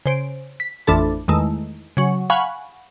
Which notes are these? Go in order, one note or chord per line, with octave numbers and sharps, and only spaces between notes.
C#3 C5 D7
B6
A1 F2 E3 D4 A4 A5
E2 D#3 G#3 A3
C#3 F#3
F5 F#5 G#5 B5 C#6